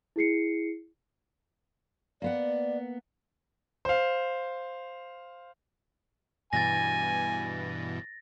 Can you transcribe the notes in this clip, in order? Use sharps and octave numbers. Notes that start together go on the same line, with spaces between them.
E4 G#4 C7 C#7
A#3 B3 D5 F#5
C5 F5
G2 B2 E3 G#5 A6 A#6